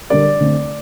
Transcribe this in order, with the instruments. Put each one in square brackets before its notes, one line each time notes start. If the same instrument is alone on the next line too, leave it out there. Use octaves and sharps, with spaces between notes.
[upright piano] D3 G3 D4 G4 A#4 [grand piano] D5
[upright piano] D3 A3 C4